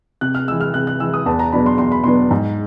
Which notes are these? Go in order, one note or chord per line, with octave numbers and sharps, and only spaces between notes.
C3 F#6
F6
E3 G#3 E6
F6
C3 F#6
F#6
E3 G#3 E6
D#6
E2 A5
A#5
B2 F#3 B3 D4 B5
C6
E2 C6
B5
B2 F#3 B3 D4 C6
G#2